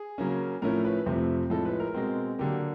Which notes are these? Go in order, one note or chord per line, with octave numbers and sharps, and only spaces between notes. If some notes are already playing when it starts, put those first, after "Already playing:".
Already playing: G#4
C#3 F#3 A#3 C#4
A2 F3 A3 C#4 A#4
B4
F2 C3 F3 A3 C4
A2 F3 G#3 A4
B4
A#4
B2 G#3 C4
D3 F#3 A#3 G4